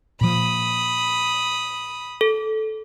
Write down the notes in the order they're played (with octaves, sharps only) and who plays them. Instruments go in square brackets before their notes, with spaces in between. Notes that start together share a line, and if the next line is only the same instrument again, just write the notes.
[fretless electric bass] A#2 F3 [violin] B5 D#6
[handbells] A4